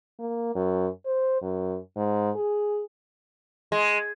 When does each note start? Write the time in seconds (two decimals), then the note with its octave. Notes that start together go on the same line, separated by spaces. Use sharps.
0.19 A#3
0.55 F#2
1.05 C5
1.42 F#2
1.96 G#2
2.36 G#4
3.72 G#3